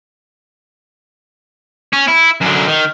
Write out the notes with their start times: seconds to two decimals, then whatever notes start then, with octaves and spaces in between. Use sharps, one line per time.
1.93 C#4
2.08 E4
2.41 F#2 D3
2.68 D#3